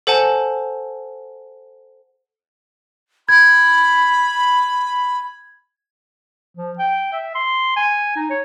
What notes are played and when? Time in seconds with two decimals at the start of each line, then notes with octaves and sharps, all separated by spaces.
0.07 A4 C5 F#5 G#5 A5
3.29 B5 G#6
6.55 F3
6.78 G5
7.13 E5
7.35 C6
7.76 G#5
8.16 D#4
8.30 C#5